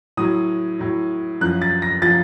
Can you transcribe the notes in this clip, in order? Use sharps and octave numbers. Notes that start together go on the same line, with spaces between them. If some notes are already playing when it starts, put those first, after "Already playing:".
A2 F#3 D#6
A2 F#3
F#2 F3 F#6
A6
A#6
F3 A6